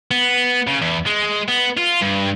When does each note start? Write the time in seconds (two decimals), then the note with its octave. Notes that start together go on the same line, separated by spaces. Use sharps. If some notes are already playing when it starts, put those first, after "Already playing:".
0.11 B3
0.67 C#3
0.82 E2
1.06 G#3
1.48 B3
1.77 F4
2.01 G2